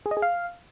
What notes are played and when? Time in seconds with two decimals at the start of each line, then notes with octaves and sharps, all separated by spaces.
0.06 G#4
0.11 D#5
0.17 G#4
0.22 F5